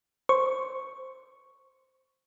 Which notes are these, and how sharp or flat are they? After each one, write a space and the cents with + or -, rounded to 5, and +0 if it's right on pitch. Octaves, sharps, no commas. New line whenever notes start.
C5 +0 C#6 +0